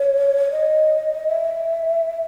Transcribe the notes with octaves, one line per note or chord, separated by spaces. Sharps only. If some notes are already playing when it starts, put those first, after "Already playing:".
Already playing: C#5
D#5
E5